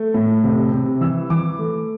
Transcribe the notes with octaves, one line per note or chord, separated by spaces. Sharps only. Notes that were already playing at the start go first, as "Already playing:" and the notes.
Already playing: A3
A2
C3
C3
E3 E6
E3 D6
A3